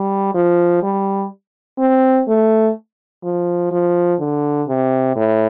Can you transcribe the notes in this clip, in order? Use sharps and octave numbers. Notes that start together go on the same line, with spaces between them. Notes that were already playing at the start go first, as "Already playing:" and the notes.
Already playing: G3
F3
G3
C4
A3
F3
F3
D3
C3
A2